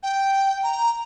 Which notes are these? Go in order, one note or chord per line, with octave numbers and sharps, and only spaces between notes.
G5
A#5